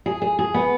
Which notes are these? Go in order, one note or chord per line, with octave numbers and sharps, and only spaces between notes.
G#4
G#4
G#4
B3